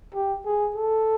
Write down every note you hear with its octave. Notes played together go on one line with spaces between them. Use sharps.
G4
G#4
A4